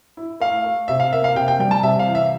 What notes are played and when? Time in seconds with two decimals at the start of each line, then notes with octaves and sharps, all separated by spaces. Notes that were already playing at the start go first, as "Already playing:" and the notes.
0.17 E4
0.40 A3 F5
0.64 A3
0.88 C3 E5
1.00 F5
1.12 A#3 E5
1.24 F5
1.35 C3 G5
1.48 G5
1.59 G3 G5
1.71 A5
1.83 C3 E5
1.99 F5
2.07 E3
2.15 E5